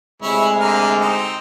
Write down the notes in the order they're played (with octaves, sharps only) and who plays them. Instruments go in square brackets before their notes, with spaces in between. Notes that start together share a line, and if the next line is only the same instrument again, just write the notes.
[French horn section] D2 C3 G#3 [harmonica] E4 C#5
[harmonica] D3 A#4 F6
C4 D#4